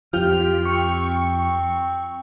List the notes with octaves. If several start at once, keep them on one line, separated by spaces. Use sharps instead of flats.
F2 F3 F4 G4 G5 F6
C4 C#6 C#7